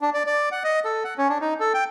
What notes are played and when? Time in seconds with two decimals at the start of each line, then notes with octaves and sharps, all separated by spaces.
0.01 D4
0.14 D5
0.26 D5
0.52 F#5
0.64 D#5
0.85 A4
1.04 F#5
1.18 C#4
1.29 D4
1.41 D#4
1.60 A4
1.74 G5